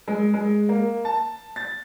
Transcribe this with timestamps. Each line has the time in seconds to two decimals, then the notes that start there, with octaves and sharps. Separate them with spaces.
0.08 G#3
0.34 G#3
0.69 A#3
1.05 A5
1.56 A6